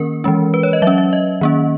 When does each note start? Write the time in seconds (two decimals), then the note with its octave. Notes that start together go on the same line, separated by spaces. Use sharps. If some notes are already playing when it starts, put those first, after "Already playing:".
Already playing: D#3 A#3 C#4 A#4
0.24 E3 G#3 C#4
0.54 B4
0.63 C#5
0.73 D#5
0.82 F#3 C#4 E5
0.98 E5
1.13 D#5
1.41 D#3 A#3 C#4